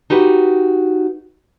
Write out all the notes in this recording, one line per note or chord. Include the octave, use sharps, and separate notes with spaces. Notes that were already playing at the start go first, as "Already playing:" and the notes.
D#4 F#4 G4 B4